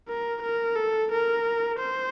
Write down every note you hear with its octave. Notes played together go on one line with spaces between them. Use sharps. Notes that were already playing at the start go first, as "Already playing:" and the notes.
A#4
A#4
A4
A#4
C5